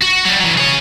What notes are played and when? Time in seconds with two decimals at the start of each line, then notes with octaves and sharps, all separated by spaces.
0.02 F#4
0.26 F#3 G3
0.40 E3 F#3
0.57 G#4 C#5